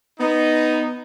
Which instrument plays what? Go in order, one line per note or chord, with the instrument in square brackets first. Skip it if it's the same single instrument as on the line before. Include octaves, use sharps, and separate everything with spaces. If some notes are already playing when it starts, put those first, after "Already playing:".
[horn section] B3 D#4